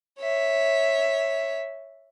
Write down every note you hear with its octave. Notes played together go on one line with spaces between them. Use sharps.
C#5 E5